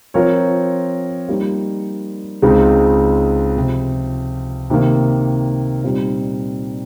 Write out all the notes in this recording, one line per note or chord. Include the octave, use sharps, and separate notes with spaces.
F3 C4 F4 A#4 C#5
G3 A#3 D#4
C#2 C#3 G#3 C4 D#4
C3 F3 C4
C3 D#3 A#3
A#2 G3 C4 D#4